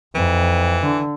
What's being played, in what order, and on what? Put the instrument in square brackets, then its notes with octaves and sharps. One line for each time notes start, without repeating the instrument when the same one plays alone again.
[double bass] F2 [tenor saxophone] E3
[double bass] D3